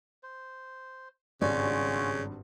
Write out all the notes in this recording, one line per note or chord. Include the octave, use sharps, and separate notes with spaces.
C5
G#1 G2 C#3 C#4 F4 F#4 D5